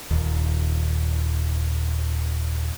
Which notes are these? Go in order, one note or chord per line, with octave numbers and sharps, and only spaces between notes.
D#1 D#2